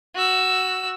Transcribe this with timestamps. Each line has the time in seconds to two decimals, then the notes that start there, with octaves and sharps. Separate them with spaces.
0.15 F#4 E6